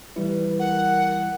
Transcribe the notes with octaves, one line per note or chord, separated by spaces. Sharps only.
E3 G3 E4 B4
A#4 F#5